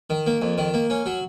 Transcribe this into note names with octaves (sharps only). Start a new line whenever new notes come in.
D#3
A#3
F2
D#3
A#3
C#4
F#3